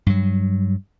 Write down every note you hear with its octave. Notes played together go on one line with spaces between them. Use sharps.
G2 F#3